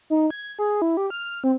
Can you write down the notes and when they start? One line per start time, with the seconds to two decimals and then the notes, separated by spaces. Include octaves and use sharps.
0.10 D#4
0.30 G#6
0.59 G#4
0.82 E4
0.97 G4
1.10 F6
1.44 C4